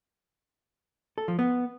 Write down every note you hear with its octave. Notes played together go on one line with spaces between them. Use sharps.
A4
F3
B3